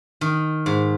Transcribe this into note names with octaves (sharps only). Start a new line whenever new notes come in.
D#3
G#2